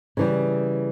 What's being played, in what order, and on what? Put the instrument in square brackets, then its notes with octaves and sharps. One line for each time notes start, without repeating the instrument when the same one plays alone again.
[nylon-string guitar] C#3 E3 G3